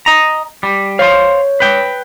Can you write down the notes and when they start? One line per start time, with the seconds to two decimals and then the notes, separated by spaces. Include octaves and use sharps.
0.06 D#5 A#5
0.63 G3
0.99 C5 C#5 F5
1.60 B4 G5